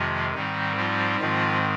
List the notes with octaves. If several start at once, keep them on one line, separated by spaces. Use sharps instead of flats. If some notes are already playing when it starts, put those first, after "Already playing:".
Already playing: F2 C3 D#3 F3 G#3 F4
G#2 D#3 G3 C4 D#4
F3 F4
G#2 D#3 F3 G#3 C4 F4